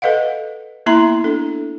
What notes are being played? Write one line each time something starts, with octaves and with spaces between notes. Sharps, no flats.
A4 B4 D#5 F5 F#5
A#3 B3 E4 E5 A#5 C6
D4 A4